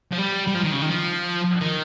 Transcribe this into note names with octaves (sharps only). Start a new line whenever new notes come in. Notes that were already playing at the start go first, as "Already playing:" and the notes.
F3
G3
G3
F3
D#3
C#3
D#3
F3
D#3